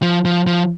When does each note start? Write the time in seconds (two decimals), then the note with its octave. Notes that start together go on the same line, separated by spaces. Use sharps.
0.02 F3
0.25 F3
0.47 F3